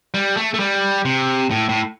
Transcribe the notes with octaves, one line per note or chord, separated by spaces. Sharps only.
G3
A3
A3
G3
C3
A2
A2